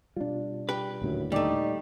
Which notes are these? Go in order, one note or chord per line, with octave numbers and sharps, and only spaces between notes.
B2 G3 D4 F4
G4 B4
D#1 F#2 A2 D3
A#2 G3 A3 D#4 D5 D6